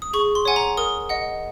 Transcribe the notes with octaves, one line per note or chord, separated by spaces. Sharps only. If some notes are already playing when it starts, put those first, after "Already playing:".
D#6
G#4 C#6
C6
C#5 F#5 G#5
A#5
A#4 D#6
D#5 F#5